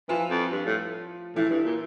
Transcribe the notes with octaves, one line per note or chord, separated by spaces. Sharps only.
E3 F3 F4
F2
G2
A2
A2 E3 E4
G2
A#2